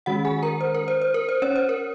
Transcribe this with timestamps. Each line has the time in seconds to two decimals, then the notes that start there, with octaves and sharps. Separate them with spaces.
0.06 D#3 G#3 C#4 F#4 F#5
0.25 G#4 G#5
0.42 A#4 A#5
0.61 C5
0.74 A#4
0.88 C5
1.02 C5
1.14 A#4
1.29 C5
1.42 C#4 C#5
1.56 C5
1.69 A#4